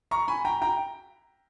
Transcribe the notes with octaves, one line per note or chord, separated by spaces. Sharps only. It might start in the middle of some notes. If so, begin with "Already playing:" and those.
A#5 C#6
G#5 B5
G5 A#5
G5 A#5